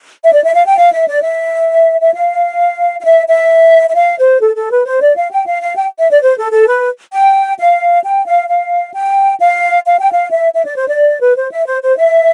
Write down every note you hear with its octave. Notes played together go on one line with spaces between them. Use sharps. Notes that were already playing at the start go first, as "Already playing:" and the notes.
E5
D5
E5
F5
G5
F5
E5
D5
E5
E5
F5
F5
E5
E5
E5
F5
C5
A4
A4
B4
C5
D5
F5
G5
F5
F5
G5
E5
D5
C5
A4
A4
B4
G5
F5
G5
F5
F5
G5
F5
F5
G5
F5
E5
E5
D5
C5
D5
B4
C5
E5
C5
C5
E5